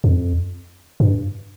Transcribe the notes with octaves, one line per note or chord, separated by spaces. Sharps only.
F2
G2